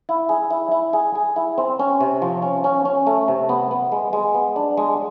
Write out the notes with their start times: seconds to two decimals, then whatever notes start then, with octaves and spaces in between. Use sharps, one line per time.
0.09 E4
0.29 G#4
0.51 E4
0.72 E4
0.93 G#4
1.15 G#4
1.36 E4
1.58 C4
1.79 C#4
2.01 C3
2.22 F3
2.42 C#4
2.64 C#4
2.85 C#4
3.07 A3
3.28 C3
3.49 B3
3.71 B3
3.92 G#3
4.13 G#3
4.35 B3
4.56 D4
4.77 G#3